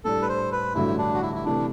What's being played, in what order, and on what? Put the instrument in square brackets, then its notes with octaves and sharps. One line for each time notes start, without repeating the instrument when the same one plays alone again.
[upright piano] A2 G3 D4 [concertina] A4
[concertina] B4
C5
B4
[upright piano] A1 G2 D3 F#3 [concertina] E4
[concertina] D4
F#4
E4
E4
[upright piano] C3 E3 A3 E4 [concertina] D4